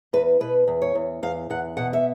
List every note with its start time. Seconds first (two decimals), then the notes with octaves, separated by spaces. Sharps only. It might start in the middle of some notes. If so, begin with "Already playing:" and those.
0.13 E2 B4
0.40 B2 B4
0.68 E2
0.82 C#5
0.95 E2
1.23 E2 F5
1.50 E2 F#5
1.77 B2 F#5
1.93 E5